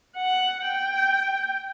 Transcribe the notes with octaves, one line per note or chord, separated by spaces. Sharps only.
F#5
G5